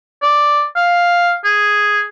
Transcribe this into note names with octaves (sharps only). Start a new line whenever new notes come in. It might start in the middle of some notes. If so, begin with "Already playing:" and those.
D5
F5
G#4